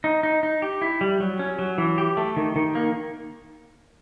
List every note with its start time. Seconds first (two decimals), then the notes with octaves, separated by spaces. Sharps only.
0.04 D#4
0.23 D#4
0.43 D#4
0.62 G4
0.82 E4
1.01 G3
1.20 F#3
1.39 C#4
1.59 F#3
1.78 E3
1.98 G4
2.17 A3
2.36 D#3
2.56 D#3
2.75 A#3